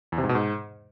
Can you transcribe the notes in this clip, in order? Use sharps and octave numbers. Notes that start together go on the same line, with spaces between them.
E2
C3
G#2
B2
G#2